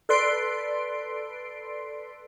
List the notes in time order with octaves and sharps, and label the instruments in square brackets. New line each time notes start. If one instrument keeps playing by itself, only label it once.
[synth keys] A4 B4 D5 C6 C7 D7